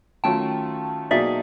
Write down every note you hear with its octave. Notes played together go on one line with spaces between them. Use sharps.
D#3 F#3 A3 C#4 F4 G5 A5
B2 F#3 A#3 D#4 G#4 D5 E5